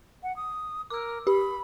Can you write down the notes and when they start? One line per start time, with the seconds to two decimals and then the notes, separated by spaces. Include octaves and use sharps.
0.23 F#5
0.36 D#6
0.90 A#4 D6 E6
1.27 G4 B5